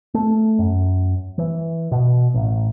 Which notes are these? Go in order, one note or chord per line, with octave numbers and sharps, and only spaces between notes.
A3
F#2
E3
B2
A1